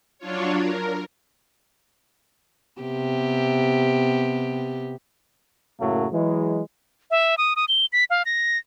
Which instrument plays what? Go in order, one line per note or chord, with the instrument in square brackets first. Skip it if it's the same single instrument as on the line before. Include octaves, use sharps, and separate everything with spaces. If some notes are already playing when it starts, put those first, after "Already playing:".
[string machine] F#3 D4 F4 C#5
A#4
[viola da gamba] C3 B3 G4
[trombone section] F#2 A2 C#3 F#3 A3 A#3
E3 F#3 G#3
[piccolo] E5
D#6
D#6
G7
B6
F5
A#6